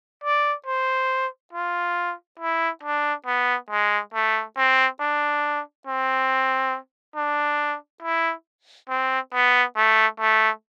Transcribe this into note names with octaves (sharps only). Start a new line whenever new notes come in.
D5
C5
F4
E4
D4
B3
G#3
A3
C4
D4
C4
D4
E4
C4
B3
A3
A3